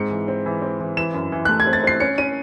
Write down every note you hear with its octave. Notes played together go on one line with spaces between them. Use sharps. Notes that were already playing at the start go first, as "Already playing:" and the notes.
Already playing: G#2 C4 C#7
E3
C4
E3
C4
E3
E3 E7
F#2
E3
A3 F#6
G#6
C4
A6
C4 C7
C#4 C#7
C#4 D#7